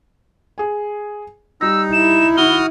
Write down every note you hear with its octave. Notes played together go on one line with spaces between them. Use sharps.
G#4 G#5
G3 D#4 E6 A#6
E4 E7
D#3 F#4 D#6 F6 G7